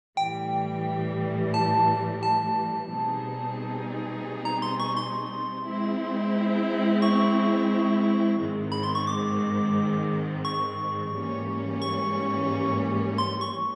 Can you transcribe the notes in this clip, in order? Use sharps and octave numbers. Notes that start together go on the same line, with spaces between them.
A2 E3 G3 G5
A5
A5
B2 G3 C4 D#4 G#4
A#5
C6
C#6
C6
G#3 C4 E4
C#6
G#2 D#3 G#3 C4
B5
C6
C#6
D6
C#6
G#2 E3 G3 A#3 C#4
C#6
C6
C#6